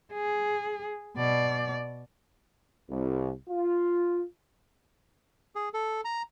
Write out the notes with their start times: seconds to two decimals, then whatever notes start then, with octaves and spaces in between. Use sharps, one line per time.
0.13 G#4
1.17 B2 D5
2.90 C2
3.50 F4
5.55 G#4
5.74 A4
6.05 A#5